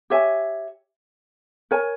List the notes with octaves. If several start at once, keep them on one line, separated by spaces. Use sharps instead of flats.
G4 C#5 E5 G#5
A#4 C#5 G#5